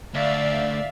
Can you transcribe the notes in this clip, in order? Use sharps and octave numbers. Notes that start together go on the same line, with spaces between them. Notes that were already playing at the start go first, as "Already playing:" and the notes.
D2 D5 E5 F5